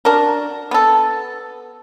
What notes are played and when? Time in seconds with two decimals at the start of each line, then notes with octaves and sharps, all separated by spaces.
0.05 D4 F#4 A#4
0.71 B3 A4